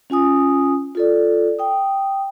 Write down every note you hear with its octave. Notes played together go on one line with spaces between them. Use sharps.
C#4 F4 G#5 D#6
F4 A4 D5
G5 D#6